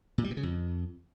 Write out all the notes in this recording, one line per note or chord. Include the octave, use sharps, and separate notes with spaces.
A#2
G3
B2
C#3
F2